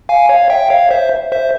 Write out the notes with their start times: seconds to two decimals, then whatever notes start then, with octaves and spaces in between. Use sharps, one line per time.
0.09 F5 G#5
0.29 C#5 F5
0.50 E5 G5
0.70 C#5 F5
0.91 C5 E5
1.32 C5 E5